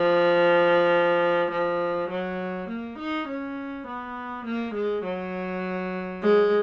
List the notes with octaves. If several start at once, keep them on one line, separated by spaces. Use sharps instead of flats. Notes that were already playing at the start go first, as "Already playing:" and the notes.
Already playing: F3
F3
F#3
A#3
D#4
C#4
B3
A#3
G#3
F#3
G#3